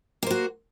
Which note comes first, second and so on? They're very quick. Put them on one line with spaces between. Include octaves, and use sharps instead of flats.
A#3 C5 F#4